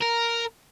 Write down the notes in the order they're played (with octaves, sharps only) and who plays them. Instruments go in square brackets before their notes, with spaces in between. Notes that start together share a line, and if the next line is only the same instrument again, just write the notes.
[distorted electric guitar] A#4